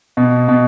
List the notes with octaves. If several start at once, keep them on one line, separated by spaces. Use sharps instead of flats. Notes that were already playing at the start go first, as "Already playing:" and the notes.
B2
B2